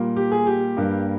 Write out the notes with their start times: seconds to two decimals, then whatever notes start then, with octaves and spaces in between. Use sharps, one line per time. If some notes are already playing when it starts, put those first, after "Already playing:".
Already playing: A#2 G3 A#3
0.16 G4
0.32 G#4
0.47 G4
0.77 G2 G3 A#3